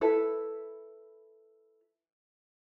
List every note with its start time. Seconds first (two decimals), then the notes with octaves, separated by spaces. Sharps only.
0.01 E4 A4 B4